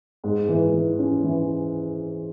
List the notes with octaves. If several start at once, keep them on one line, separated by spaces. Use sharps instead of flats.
G#2
E3
E3
C#4
E3